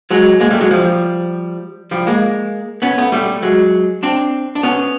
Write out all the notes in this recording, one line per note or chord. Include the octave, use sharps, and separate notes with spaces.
F#3 G#3
G#3 A#3
G3 A3
F#3 G#3
F3 G3
F3 G3
G#3 A#3
B3 C#4
A3 B3
G3 A3
F#3 G#3
C4 D4
D4
B3 C#4